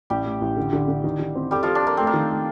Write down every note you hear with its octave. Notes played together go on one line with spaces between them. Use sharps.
A1 G3 G4
A2
A1
D3
D3
D3
D#3
D#3
C4
G3 G4 A4
F3 F4 A4
D4
A#3 A4
A3 C4
A#3
D#3
A3